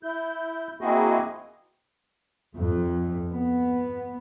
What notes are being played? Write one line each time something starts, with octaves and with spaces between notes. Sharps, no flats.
E4 G6
A#3 C4 E4 F#4 G#4 D#5
F2
B3